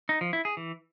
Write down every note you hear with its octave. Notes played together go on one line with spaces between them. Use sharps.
D#4
F3
E4
G#4
E3